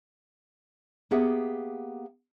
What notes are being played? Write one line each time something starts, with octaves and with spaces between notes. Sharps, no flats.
A#3 B3 G4 G#4 E5 F#5